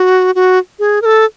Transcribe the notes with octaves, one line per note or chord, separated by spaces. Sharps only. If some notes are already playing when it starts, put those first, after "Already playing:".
Already playing: F#4
F#4
G#4
A#4
A4